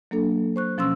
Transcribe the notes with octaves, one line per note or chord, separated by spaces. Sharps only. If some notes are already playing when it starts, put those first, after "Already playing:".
F#3 A#3 D4 A4
C5 C#6 F#6
B2 F3 C#4 C6 E6